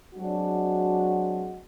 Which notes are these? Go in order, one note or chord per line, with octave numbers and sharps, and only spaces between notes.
F#3 G#3 C4 D4 F#4